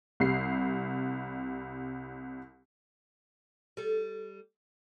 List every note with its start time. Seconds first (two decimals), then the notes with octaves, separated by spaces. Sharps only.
0.20 C2 G3 C7
3.77 G3 A4